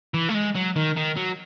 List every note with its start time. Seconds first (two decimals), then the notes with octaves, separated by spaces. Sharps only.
0.14 E3
0.29 A3
0.34 G#3
0.55 F#3
0.76 D#3
0.97 D#3
1.17 F#3